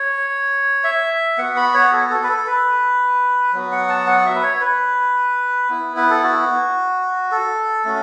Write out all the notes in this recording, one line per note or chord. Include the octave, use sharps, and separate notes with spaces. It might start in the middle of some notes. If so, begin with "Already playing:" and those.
Already playing: C#5
E5
B3 F#4 F#5
B5
C#5
A4
A4
B4
A4
B4
F#3 B3 F#4
F#5
A5
F#5
E5
B4
C#5
B4
B3 E4
B4
A4
F#4
A4
A3 C#4 F#4